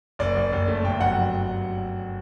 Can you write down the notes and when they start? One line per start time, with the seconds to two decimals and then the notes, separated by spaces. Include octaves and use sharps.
0.19 F#1 D5
0.37 F#1
0.53 F#1
0.68 A3
0.84 G1 G5
1.01 F#3 F#5